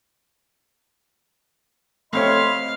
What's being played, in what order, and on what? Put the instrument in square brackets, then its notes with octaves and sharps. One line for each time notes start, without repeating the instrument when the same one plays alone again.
[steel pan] A3 C4 C#5 [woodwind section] D#5 B5 C6 [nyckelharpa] F5